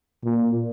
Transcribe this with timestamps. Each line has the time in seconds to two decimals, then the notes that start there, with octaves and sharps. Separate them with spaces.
0.24 A#2